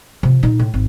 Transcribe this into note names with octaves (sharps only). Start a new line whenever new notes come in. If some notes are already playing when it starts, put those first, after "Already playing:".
C3 F3
A#2 D#4
A2
G#1